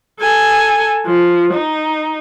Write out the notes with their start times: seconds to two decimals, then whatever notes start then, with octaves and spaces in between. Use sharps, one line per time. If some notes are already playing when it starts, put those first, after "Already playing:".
0.20 A4 G#5
1.06 F3
1.54 D#4